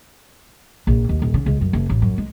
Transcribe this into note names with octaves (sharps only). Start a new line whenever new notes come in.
A#1
D#2
D#1
C#3
C#2
F#2
F#1
A1
F#2
G#3